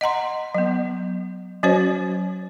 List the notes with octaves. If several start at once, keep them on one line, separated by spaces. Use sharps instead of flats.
D#5 F#5 A#5 C6
F#3 B3
F#3 C#4 F#4 C5 C#5